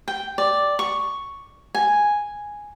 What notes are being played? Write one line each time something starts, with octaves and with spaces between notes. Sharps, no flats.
G5
D5
C#6
G#5